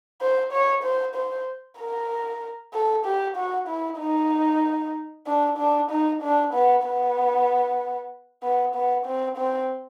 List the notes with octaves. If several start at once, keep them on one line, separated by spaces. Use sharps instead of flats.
C5
C#5
C5
C5
A#4
A4
G4
F#4
E4
D#4
D4
D4
D#4
D4
B3
B3
B3
B3
C4
C4